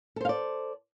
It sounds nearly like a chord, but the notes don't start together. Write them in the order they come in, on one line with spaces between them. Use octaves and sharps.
A4 C5 F5 D5